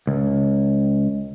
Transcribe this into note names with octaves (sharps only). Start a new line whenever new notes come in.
C#2